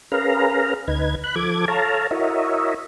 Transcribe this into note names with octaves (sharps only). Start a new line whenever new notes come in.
C#4 G#4 A#4 B4 F5 A#5
D2 D#4 B4 G#6
B5 F#6
F3 A4 D6 G#6
A4 C#5 F5 A5 A#5
E4 F#4 A#4 C#5 D#5 E5